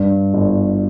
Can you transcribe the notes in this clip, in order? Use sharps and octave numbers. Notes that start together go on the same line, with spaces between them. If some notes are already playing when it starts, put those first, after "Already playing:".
Already playing: G2
G1